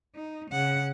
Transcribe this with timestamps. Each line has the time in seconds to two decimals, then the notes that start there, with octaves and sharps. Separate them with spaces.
0.15 D#4
0.51 C#3 F#5